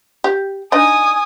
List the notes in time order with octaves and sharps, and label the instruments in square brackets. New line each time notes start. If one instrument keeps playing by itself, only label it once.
[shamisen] G4
[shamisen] D4 D#4 [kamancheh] G#5 D#6